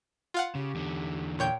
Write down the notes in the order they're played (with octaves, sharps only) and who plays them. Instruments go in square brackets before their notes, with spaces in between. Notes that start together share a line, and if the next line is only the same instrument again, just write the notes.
[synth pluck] F4 F5 F#5
[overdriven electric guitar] C#3 [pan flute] G4
[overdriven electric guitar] E2 D3
[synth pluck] A#2 C#5 G6 [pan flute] G5